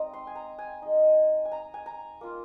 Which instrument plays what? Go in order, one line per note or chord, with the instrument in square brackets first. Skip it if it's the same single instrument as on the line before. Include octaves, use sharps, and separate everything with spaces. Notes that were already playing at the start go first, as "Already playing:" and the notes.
Already playing: [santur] G#3 C4 D#4 D#5 A#5
C6
G#5
A#5
G#5
G#3 D#4
G#5
A#5
G#5
A#5
A#3 F4